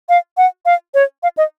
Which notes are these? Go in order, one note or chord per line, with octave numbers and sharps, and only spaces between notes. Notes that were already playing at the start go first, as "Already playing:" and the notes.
F5
F#5
F5
C#5
F5
D#5